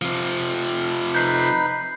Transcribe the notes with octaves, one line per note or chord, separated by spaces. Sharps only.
C3 F3
D#4 B4 B5 G6 C7